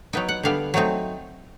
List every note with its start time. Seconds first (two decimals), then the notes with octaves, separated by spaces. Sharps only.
0.13 F#3 B3 D#4 G5
0.29 F#5
0.43 D3 G3 B3 F5
0.74 F#3 A3 C4 D#4